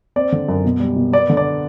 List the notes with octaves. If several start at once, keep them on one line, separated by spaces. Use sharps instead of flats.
C4 D5
D3
F#2
B2
G3
B2
B3 D5
D3
D5